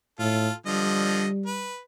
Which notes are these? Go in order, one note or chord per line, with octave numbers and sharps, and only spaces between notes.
A2 F4 A4
D3 F3 G3 D#5
B4